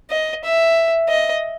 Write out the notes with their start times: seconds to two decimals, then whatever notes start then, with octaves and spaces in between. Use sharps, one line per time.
0.11 D#5
0.44 E5
1.09 D#5